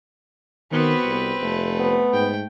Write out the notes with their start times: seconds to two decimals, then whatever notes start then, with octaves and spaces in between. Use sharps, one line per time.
0.72 D#3 B3 C4 F#4 B4
1.05 C2
1.41 F1 A3
1.80 B3
2.13 G#2 G5